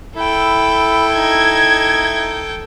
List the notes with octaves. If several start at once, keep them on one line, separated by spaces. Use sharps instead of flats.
E4 A4 G5 B5
D#4 G#6